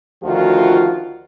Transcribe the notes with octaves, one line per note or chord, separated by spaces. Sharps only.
D2 D#3 F3 F4 F#4